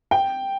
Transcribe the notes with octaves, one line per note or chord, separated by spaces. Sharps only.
G5